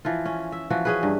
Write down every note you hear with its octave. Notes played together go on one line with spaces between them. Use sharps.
E3 F3 F4
C#4
E5
E3 F3 F#4
C#4 G#4 B4
G2